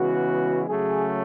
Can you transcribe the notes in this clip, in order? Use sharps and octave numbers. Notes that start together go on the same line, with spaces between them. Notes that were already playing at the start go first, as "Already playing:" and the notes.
Already playing: C#3 E3 G#3 B3 F#4
C#3 F#3 A3 G#4